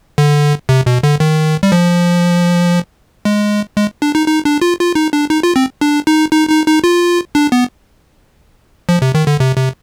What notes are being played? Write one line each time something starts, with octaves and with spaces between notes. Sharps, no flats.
D3
C3
B2
D3
D#3
G3
F3
G#3
G#3
D4
D#4
D#4
D4
F4
F4
D#4
D4
D#4
F4
C4
D4
D#4
D#4
D#4
D#4
F4
D4
B3
F3
C3
D#3
D3
C3
C3